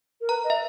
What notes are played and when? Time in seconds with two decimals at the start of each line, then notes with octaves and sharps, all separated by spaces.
0.20 A#4
0.29 B4 A#5
0.43 D#5
0.50 E5